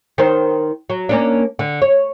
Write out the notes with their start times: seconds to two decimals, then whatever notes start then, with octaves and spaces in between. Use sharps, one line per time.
0.18 D#3 C5
0.90 F#3
1.09 A#3 C#4 D4
1.59 D3
1.82 C#5